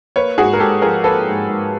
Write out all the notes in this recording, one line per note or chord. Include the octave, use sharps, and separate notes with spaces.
A#3 B4 C#5
G#2 F#4 G#4
A#4
G#2 G4 A4
F3 G#4 A#4
A#3 A4 B4
G#2
G#2